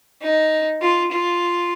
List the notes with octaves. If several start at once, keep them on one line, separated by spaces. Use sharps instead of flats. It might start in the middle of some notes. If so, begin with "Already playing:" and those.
D#4
F4
F4